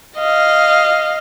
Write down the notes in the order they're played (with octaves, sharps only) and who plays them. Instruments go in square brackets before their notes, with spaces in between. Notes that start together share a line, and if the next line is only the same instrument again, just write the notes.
[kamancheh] D#5 F5